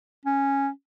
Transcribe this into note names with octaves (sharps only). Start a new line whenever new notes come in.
C#4